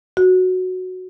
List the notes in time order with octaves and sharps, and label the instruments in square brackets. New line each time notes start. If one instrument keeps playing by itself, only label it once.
[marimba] F#4